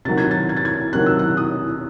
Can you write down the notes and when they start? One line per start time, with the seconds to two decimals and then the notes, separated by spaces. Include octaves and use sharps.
0.05 C3 D#3 F#3 A6
0.18 G#6
0.31 A6
0.49 G#6
0.57 A6
0.65 G#6
0.93 C3 D#3 F#3 F#6
1.06 E6
1.19 F#6
1.37 D#6